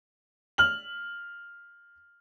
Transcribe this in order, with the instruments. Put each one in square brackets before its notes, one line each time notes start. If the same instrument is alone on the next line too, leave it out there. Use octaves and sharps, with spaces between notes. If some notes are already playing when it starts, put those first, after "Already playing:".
[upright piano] F6 F#7